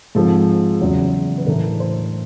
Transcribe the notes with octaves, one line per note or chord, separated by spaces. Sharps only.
G#2 F3 G#3 C4 A4
E2 C#3 F#3
B4
A2 E3 A3 D4 A#4
C5